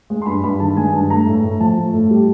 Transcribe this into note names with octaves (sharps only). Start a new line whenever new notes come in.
G#3
C6
G2 B5
G2 B5
D#3 A5
G#3 G#5
G2 A5
A3 A#5
A2
A2
F3 A5
A3
A2
G3